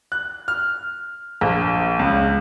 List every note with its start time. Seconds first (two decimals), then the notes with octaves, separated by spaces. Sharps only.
0.12 F#6
0.48 F6
1.41 A#1
1.99 C#2